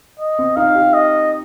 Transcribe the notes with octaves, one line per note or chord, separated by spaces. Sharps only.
D#5
C4
D#4 F5
G4
D#5